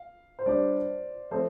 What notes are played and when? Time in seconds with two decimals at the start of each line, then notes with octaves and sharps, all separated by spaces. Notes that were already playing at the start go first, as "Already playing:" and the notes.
Already playing: F5
0.39 C5
0.46 G3 D4 G4 D5
1.31 F3 A3 C4 C5